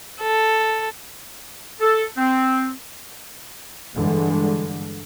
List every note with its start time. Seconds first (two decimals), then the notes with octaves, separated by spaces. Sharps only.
0.22 A4
1.81 A4
2.17 C4
3.97 G2 D3 E3 G#3